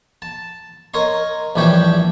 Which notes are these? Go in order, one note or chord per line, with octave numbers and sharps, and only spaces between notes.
A5
A#4 C#5 D#5 C6
A#1 E3 G3 D4 C#5 G5